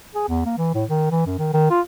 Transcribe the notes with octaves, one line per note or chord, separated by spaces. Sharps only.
G#4
E2
A#3
E3
A2
D#3
E3
F#2
D#3
D#3
F4